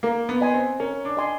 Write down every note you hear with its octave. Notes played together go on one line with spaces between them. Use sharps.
A#3 A#4
B3
D#5 G#5 C6
C4
C#4 A#4
D4
D#5 G#5 C6